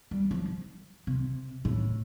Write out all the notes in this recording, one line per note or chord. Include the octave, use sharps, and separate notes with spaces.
G3
F3
C3
A2